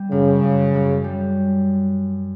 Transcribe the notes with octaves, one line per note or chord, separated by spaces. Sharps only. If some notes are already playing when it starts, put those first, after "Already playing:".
Already playing: G3
F#2 C#3
F#2
F#2
G3